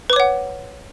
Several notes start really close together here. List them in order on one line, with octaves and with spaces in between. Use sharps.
B4 D6 C#5 F#5